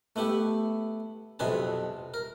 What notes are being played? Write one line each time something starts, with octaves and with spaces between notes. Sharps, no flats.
A3 B3 E4 G4
B1 F2 C3 G#4 B4 A5
A#4